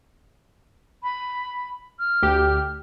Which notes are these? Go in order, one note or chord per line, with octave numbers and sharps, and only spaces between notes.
B5
F6
D2 G4